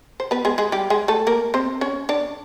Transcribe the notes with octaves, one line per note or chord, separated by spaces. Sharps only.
C5
B3 B4
G#3 G#4
G#3 G#4
G3 G4
G#3 G#4
A3 A4
A#3 A#4
C4 C5
C#4 C#5
D4 D5